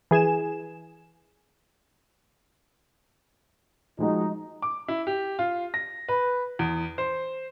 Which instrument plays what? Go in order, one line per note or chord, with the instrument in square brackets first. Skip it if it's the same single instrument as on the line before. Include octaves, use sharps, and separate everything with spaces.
[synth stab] E3 G#4 G#5 E7
[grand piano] F3 G#3 F#4 [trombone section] D#4
[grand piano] D6
E4
G4
F4
A#6
B4
E2
C5